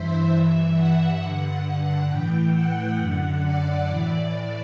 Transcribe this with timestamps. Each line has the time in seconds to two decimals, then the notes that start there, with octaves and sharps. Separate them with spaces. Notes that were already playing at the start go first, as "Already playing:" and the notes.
Already playing: G2 E3 C5 E5
0.30 G2 E3
0.74 F#5
1.19 G2 D3 F#5
2.08 A2 E3 G5
2.53 F#5
2.98 F#2 D3
3.43 D5
3.87 A2 E3 D5
4.32 D5